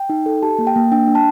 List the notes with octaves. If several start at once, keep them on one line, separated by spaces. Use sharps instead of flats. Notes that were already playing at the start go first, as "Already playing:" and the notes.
Already playing: G5
D#4
A4
G4 A5
A#3
G5
A#3
D4 G5
D4
A5